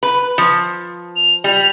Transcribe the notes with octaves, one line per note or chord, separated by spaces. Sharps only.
B4
F3
F7
G3